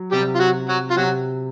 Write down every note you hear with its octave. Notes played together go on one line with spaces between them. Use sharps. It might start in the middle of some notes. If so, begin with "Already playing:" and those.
Already playing: F#3
C3 G3 G4
F4
F#3 F#4
F#3 F#4
F4
C3 F#3 F#4